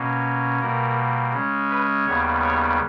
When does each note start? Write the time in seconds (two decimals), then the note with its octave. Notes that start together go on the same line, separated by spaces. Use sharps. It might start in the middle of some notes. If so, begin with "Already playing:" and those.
Already playing: B2 A#3 C#4
0.61 B2 G3 A#3 A#4
1.33 C#3 G#3 C#4
1.70 B4
2.06 D#2 C#3 G3 B3 C#5
2.43 C#5